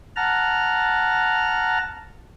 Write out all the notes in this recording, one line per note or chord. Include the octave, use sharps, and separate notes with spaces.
F#5 A5 A#5 F6